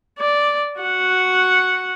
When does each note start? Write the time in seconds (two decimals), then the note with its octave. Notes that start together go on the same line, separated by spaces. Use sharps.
0.19 D5
0.80 F#4 F#5